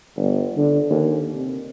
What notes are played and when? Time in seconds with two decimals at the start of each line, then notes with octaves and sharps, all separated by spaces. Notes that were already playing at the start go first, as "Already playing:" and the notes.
0.16 G1
0.57 D3
0.90 D#2
1.35 C3